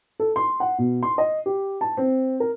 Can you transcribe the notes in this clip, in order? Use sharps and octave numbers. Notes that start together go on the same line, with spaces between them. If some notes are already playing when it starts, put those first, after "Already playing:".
A4
C6
F#5
B2
C6
D#5
G4
A5
C4
A#4